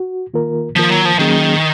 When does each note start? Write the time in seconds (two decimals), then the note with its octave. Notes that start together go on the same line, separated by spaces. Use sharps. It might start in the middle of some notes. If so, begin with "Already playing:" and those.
Already playing: F#4
0.34 D#3 A#3 F4 A#4
0.76 D#3 F3 A#3 F4 A#4
0.91 F#3
1.05 F3
1.19 D#3 F#3 A#3 C#4 G#4